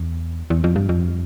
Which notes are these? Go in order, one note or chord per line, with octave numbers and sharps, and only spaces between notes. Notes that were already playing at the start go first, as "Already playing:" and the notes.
Already playing: E2
E2
F2
G2
F2